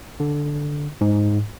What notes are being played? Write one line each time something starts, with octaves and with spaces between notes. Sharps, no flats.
D3
G#2